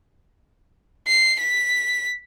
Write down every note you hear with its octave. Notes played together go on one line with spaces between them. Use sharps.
C7
B6